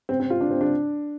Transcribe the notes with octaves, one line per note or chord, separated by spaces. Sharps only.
C4
C4
F4
D4
C4
D4